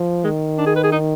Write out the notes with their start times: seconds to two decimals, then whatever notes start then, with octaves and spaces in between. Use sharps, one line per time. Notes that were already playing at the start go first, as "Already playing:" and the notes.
Already playing: F3
0.24 D#3 G#3
0.58 D4
0.66 G#4
0.76 B4
0.83 G#4
0.92 D#4